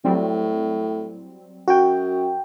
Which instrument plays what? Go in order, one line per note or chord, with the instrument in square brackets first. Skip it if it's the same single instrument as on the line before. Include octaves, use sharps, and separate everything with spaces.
[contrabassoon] A2 [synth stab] F#3 G3 C4
[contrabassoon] F#2 [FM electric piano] F#4 G5